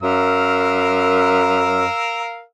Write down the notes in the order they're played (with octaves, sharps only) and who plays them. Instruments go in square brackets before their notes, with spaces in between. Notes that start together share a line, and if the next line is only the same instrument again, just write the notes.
[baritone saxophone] F#2 [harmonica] A#4 F5 E6